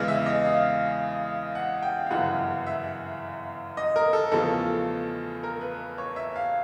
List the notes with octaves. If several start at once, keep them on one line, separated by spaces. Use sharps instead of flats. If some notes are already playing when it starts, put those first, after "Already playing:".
Already playing: E2 C#3 E3 G#3
E5
D#5
F5
F#5
G5
F5
G1 F#2 C#3 E3 F#5
E5
D#5
A#4
A4
E2 C#3 F3 A3 A4
A#4
B4
C#5
E5
F5